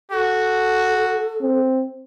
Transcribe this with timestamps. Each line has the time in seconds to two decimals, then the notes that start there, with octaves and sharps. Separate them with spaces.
0.11 F#4 A4
1.41 C4